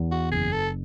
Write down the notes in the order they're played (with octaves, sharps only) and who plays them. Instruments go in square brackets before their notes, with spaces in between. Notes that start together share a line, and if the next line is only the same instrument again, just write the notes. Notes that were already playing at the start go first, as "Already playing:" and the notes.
Already playing: [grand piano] E2
[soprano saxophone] F#4
[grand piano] F#1 [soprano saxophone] G#4
[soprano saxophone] A4